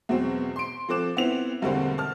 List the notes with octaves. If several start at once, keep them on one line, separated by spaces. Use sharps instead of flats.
E2 B2 F#3 C4
C6 D7
F3 C4 A4 D6 F#6 E7
B3 C4 E4 F7
E2 G2 B2 D3 A#3 C4
A5 F6